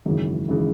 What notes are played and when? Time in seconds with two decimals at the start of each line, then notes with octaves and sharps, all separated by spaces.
0.05 G#1 F#2 C#3 E3 G#3
0.48 G#1 C#3 E3 G#3